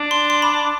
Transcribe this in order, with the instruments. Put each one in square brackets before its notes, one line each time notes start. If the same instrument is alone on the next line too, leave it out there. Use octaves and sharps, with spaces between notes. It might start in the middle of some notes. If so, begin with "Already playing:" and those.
Already playing: [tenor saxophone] D4
[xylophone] C6
C6
B5